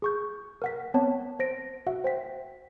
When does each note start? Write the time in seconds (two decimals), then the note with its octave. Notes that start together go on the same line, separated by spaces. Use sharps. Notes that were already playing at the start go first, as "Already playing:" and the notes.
0.02 G#4 C#6 G6
0.62 A#4 F#5 B6
0.94 B3 C4 C#5 F#5 A5
1.39 C5 A#6 D7
1.86 F#4 E5 F#5
2.04 C5 G5 B6